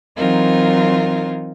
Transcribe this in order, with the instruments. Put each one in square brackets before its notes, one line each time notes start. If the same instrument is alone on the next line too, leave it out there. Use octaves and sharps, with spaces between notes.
[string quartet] E3 F#3 C4 D#4 F4 A#4